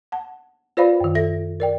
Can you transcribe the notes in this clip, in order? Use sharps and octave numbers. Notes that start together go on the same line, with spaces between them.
F#5 A5
F4 B4 C5 D5 F5 B5
F#2 D#3
A4 E5 A#6
A#4 D5 G5